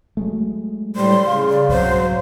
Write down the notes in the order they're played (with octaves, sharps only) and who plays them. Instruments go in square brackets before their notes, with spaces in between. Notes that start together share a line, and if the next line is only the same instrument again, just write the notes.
[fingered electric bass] F#3 G#3 A3
[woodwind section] D2 A2 [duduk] G3 [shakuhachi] C6
[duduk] C#3 [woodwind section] F5
[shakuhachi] D5
[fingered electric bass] C2 G#2 B2 [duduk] F#3 [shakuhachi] C5